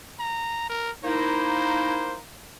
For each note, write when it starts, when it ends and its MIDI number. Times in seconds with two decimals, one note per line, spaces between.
0.19 0.64 82
0.69 0.91 70
1.04 2.18 58
1.04 2.18 63
1.04 2.18 64
1.04 2.16 72